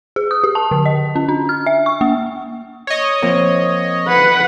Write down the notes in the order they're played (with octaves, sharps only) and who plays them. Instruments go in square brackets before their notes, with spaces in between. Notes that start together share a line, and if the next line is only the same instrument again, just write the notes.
[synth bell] G#4
D#6
G4
A5
D3
D#5
C#4
D4
F6
E5
C#6
A#3
[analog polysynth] C#5 D#5
[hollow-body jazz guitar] F3 A#3 C4
[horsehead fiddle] B4 F#5